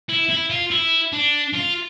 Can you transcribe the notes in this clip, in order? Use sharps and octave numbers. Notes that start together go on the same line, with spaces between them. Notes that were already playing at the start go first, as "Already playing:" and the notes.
E4
E4
F4
E4
D4
F4